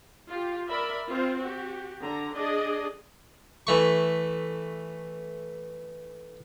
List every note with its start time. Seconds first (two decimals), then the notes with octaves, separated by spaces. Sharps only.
0.30 F4 G4
0.69 A#4 D5 E5 B5
1.09 C4 F4 C5
1.40 F#4 G4
2.00 D3 A#5
2.34 D4 G#4 D5 D#5
3.67 E3 A3 C#6